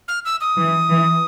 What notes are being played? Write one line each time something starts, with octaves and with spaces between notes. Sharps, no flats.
F6
E6
D#6
E3
E3